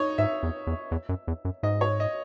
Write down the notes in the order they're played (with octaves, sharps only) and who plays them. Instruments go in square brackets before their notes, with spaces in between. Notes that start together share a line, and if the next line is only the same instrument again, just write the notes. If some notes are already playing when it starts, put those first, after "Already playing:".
Already playing: [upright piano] D#4 C#5
[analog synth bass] G#2 [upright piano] E5
[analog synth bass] E2
E2
E2
F#2
E2
F#2
[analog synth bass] G#2 [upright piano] D#5
[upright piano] C#5
D#5